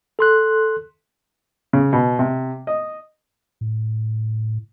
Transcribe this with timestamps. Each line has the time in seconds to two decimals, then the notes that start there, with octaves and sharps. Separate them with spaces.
0.19 A4 C6 F#6
1.73 C#3
1.93 B2
2.19 C3
2.67 D#5
3.61 A2